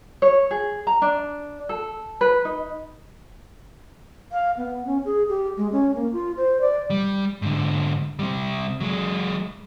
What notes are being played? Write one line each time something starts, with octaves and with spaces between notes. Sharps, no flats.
C#5
G#4
A#5
D4
A4
B4
D#4
F5
B3
C#4
G#4
G4
G#3
C#4
A#3
F4
C5
D5
G3
G#2 D3
C3 G3
F#3 G#3